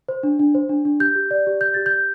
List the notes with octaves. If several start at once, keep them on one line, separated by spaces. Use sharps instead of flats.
C5
D4
D4
C5
D4
D4
G4 G6
G4
D5
G4
D5 G6
G4 A6
G6
G4